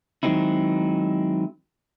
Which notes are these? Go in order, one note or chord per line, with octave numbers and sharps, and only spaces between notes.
D#3 F#3 G#3 C4 D#4 E4